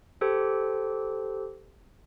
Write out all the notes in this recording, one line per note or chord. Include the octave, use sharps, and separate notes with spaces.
G4 A4 C5